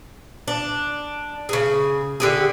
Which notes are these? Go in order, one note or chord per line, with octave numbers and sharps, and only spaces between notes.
D4
C#3 G#4
D3 G4 G#4